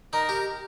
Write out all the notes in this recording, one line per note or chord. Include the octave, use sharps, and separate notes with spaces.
D#4 A#4
G4